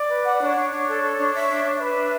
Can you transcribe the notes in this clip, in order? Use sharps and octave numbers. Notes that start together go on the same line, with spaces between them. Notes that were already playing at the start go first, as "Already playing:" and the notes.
Already playing: D5
B4
F#5
D4 C#5
D4
D4
A4
A4
D4
E5
D4
D4
B4 E5
D4